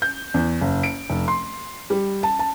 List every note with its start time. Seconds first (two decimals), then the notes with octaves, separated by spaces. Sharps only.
0.02 G6
0.34 E2
0.61 F#1
0.83 D7
1.10 F1
1.28 C6
1.90 G3
2.23 A5
2.39 A5